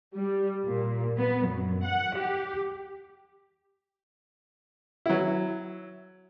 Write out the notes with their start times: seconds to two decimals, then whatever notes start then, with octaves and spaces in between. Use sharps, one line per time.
0.15 G3
0.66 A#2
1.18 B3
1.48 F#2
1.86 F#5
2.18 G4
5.06 F#3 E4